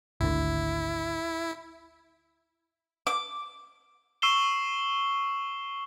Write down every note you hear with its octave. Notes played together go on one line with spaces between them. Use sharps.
G#1 D2 D3 E4
D6
C#6 E6 C7 E7 G7